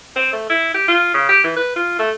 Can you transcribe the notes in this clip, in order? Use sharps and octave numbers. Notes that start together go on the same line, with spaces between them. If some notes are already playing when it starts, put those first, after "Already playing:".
C4
A3
E4
G4
F4
C#3
G4
E3
B4
F4
A3